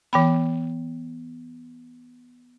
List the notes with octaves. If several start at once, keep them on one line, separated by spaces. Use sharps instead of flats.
E3 B3 G5 B5